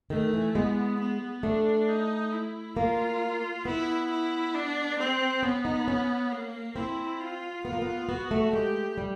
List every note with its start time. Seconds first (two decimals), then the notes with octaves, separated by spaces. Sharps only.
0.10 D#3 A3
0.33 E3
0.55 G#3 B3
0.99 B3
1.43 A3 D4
1.88 D#4
2.33 E4
2.77 A#3 F4
3.65 B3 E4
4.10 E4
4.54 D4
4.99 C4
5.43 B3 C#4
5.65 D#4
5.88 C#4
6.31 A#3
6.76 C4 E4
7.20 F4
7.64 B3 F4
7.73 A#3
7.82 B3
8.09 B3 F#4
8.31 A3
8.53 G#3 G4
8.98 G3